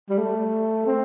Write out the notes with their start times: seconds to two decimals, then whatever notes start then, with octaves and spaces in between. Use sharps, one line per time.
0.10 G3
0.18 A3
0.86 C4